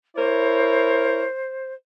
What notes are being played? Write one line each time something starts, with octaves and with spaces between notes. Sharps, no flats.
E4 A#4 C5 C#5